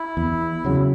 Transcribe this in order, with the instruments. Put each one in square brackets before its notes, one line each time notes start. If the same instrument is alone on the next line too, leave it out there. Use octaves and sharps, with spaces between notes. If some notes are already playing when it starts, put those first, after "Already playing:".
Already playing: [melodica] E4
[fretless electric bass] E2
C#3 F#3